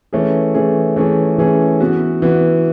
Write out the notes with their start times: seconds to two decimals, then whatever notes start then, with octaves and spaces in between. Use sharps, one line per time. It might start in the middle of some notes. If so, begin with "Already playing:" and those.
0.13 E3 A3 C#4 G#4
0.55 E3 A3 C#4 G#4
0.96 E3 A3 C#4 G#4
1.38 E3 A3 C#4 G#4
1.80 E3 B3 F#4
2.22 E3 B3 F#4